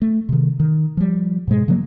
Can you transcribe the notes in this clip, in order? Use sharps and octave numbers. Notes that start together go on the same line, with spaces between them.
A3
C3 D#3
D#3
F3 G3
G#2 B2 G#3
C#3 F3 F#3 A#3